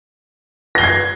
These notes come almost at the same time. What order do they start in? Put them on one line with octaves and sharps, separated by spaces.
A#6 G7 C7 G#6